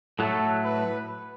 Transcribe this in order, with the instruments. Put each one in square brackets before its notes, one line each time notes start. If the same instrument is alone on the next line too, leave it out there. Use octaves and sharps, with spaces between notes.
[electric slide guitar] A2 F#3 A3 [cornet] A4
[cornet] B4